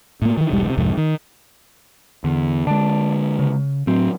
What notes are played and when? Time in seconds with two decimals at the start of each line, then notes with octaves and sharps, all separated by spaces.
0.22 A2 A#3
0.37 D#3 E3
0.51 E1 B1 G#2 G3
0.66 C3 E3
0.77 C2 F2 G#2 C3
0.97 D#3
2.24 E2 D3
2.67 D3 G#3 D5 A5
3.39 C#3
3.87 A2 F#3 C4